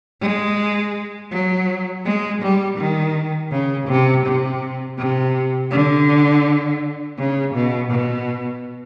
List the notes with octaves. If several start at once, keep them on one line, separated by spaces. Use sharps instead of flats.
G#3
F#3
G#3
G3
D#3
C#3
C3
C3
C3
D3
C#3
B2
B2